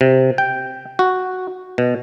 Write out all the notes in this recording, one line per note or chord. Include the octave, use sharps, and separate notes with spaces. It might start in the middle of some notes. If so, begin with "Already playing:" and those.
C3
G5
F#4
B2